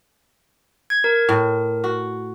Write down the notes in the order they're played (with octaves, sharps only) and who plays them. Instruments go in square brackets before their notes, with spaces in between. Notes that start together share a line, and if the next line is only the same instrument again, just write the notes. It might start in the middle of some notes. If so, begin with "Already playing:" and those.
[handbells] G#6
A#4
[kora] A2
F#4